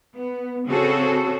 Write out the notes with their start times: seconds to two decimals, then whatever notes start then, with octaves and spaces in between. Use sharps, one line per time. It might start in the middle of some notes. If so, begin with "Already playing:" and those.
0.16 B3
0.67 C#3 C4 C#4 F#4 G#4 A4